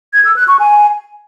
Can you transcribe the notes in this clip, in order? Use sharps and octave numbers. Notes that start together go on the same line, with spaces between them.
G#6
E6
F#6
C#6
G#5